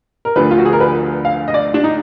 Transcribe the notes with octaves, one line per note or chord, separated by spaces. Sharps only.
A#4
D2 D3 F3 B4
F4
F#4
G#4
A#4
B4
F5
D#5
D5
D4
D#4